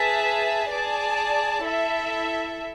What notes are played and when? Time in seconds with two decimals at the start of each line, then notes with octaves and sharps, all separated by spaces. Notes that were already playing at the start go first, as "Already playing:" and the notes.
Already playing: G#4 B4 E5 A5
0.70 G#4 D5 A5
1.65 E4 A4 E5